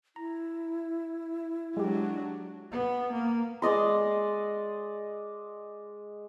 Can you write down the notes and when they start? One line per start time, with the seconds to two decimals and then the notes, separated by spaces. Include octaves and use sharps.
0.16 E4 A#5
1.77 F#3 G#3 D4 G4
2.72 B3
3.13 A#3
3.62 G#3 D5 D#5 C6